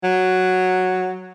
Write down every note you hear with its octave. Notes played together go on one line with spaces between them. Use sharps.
F#3